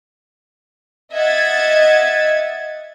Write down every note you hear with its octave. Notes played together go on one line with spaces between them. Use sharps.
D#5 E5 F#5 G#6 A6